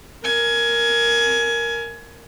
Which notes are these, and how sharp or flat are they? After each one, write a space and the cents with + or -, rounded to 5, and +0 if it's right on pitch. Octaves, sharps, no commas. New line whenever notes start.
A#4 +0 G#5 +20